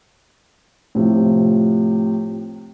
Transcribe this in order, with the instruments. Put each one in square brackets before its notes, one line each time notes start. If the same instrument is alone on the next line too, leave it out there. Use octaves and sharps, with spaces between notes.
[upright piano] A2 C3 F3